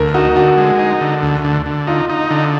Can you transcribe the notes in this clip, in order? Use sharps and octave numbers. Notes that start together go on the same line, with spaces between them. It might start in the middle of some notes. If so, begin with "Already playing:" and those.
Already playing: D2 A#4
D#4 F#4
D3 F#4
G#3
D#4
D3
D2
D3
D3
D#4 F4
D#4
D3